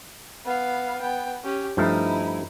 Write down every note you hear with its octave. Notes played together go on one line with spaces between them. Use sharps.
B3 F5
B3 G5
C#4 G4
G2 F3 A3 D#4 E4